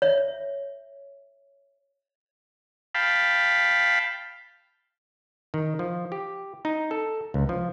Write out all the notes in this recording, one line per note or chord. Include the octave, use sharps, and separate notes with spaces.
C#5 E5
F5 G5 A5 B5
D#3
F3
G4
D#4
A4
C#2
F3